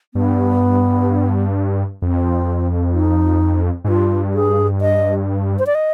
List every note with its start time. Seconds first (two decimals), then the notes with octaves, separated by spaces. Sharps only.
0.14 G2 B3
2.02 F2 C4
2.94 D#4
3.84 G#2
3.88 G2 F4
4.34 G#4
4.81 D#5
5.59 C5
5.67 D5
5.75 D#5